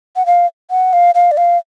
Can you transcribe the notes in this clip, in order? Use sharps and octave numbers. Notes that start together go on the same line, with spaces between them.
F#5
F5
F#5
F5
F5
D5
F5